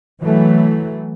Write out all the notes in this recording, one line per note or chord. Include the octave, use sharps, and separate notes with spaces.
E3 F#3 A3